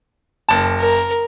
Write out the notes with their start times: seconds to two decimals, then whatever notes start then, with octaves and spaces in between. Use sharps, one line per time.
0.49 F#1 A5
0.80 A#4